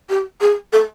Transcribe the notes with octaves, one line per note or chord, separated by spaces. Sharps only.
G4
G#4
A4